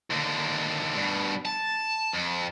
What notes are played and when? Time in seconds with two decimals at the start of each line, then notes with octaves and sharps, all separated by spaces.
0.10 D#2 D3
0.96 G2 B2
1.45 A5
2.13 F2